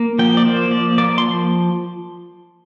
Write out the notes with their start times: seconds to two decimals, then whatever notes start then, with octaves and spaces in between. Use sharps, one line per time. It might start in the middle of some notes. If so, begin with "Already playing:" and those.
Already playing: A#3
0.19 F3 G5
0.37 D5
0.45 A#3 C5
0.71 F3 D5
0.98 A#3 D5
1.18 C6
1.24 F3